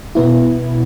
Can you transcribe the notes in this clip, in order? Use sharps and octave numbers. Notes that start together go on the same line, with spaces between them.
B2 B3 E4